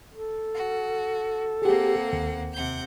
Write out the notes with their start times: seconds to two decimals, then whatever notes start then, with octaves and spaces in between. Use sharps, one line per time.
0.11 A4
0.55 F#4
1.62 A#3 C4 G4 G#4 F#5
2.13 D#2
2.53 C3 F#5 G6